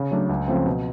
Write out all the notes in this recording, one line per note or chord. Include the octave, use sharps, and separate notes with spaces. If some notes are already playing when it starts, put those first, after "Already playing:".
Already playing: C#3
F#3 A3 D4
C#2
C#3 F3 A3 C4
B2